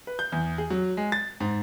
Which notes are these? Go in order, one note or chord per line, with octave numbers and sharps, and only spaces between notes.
B4
G6
E2
G#4
F#3
G#3
A6
G#2